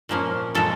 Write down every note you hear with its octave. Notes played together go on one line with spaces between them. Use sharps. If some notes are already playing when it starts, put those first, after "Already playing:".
A#2 F3 A#3 C#4
A#2 F3 G#3 A4